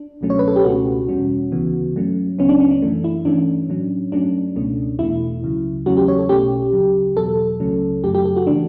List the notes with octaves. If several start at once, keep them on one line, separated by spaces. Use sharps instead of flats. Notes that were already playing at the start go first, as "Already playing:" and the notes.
Already playing: D4
C#2 B2 F#3 A3 C#4
C#5
B4
A4
G4
C#2 B2 A3 C#4 F#4
E2 B2 G3 C#4
D2 C#3 E3 B3
G2 F#3 A3 C#4
C#2 C#3 F#3 B3 C#4
D4
C#4
D4
F#2 E3 A3
E4
G2 E3 A3 C#4 D4
A2 F#3 C#4
G2 F#3 A3 C#4 D4
C#2 B2 A3 C#4
E2 B2 A3 E4
C#2 C#3 F#3
E2 C#3 F#3 A3 C#4 F#4
G4
C#5
A4
B1 B2 A3 C#4 G4
D2 C#3 F#3
E2 B2 F#3 A4
C#2 C#3 F#3 A3 C#4
G1 F#2 C#3 F#3 A3 G4
G4
A4
F#4
C#3 E3 A3 D4